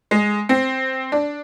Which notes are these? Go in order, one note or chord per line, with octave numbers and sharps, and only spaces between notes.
G#3
C4
D4